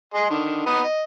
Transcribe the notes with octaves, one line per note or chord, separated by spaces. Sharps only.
G#4 D#5 C6
D3 D#3
B3 D#4 D#6
D#5